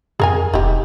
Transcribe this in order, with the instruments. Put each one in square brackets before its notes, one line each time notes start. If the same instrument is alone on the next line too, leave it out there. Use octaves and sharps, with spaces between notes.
[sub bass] F2 [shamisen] G#4 A#4 G#5
[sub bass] E1 [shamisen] D#4 G4